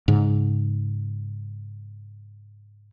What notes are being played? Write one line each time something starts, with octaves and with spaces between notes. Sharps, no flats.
G#2 C#3